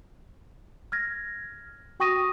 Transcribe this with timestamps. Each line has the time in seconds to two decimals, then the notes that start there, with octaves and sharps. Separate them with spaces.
0.92 F6 G#6 A#6
2.00 F#4 G5 C#6 D#6 A#6 D#7